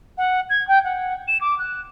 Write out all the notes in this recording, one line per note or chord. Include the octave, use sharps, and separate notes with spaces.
F#5
G#6
G5
F#5
E7
D6
F#6